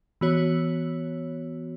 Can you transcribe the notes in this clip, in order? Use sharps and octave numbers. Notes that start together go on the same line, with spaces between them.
E3 B3 F#4 C#5